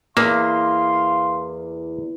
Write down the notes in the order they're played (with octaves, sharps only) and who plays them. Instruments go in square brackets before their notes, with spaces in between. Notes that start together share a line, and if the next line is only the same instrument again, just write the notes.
[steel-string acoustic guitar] E2 [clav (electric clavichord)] A#3 [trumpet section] F5 C6